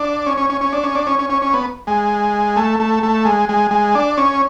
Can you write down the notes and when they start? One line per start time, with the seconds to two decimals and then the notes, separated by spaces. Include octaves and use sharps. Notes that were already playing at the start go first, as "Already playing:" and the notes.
Already playing: D4
0.26 C#4
0.37 C#4
0.50 C#4
0.61 C#4
0.73 D4
0.83 C#4
0.95 D4
1.07 C#4
1.19 C#4
1.30 C#4
1.42 C#4
1.54 B3
1.87 G#3
2.56 A3
2.80 A3
3.03 A3
3.25 G#3
3.49 G#3
3.71 G#3
3.95 D4
4.18 C#4